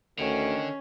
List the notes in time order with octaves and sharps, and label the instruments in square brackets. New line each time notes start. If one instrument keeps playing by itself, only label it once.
[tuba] D2 [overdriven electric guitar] D3 [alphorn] D#3 [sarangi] C#4